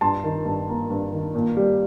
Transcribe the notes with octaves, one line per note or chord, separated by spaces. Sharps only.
G2 A5 C6
D#3
G2
A#3
G2
D#3
A#2
G3